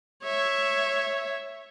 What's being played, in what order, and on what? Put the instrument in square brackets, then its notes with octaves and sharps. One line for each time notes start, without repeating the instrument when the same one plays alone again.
[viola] C#5 E5